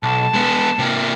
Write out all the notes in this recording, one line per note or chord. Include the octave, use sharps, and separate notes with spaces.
B1 A5
G#3 B3
C3 A#3